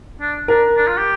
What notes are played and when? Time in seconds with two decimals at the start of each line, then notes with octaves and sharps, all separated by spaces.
0.21 D4
0.48 D4 A#4
0.77 D4
0.87 F4
0.97 G4